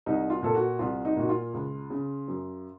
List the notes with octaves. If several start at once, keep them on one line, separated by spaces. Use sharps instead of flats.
C2 D#4
F4
A#2 A4
F#4
C2 F4
D#4
A#2 F#4
F4
C#2
C#3
F#2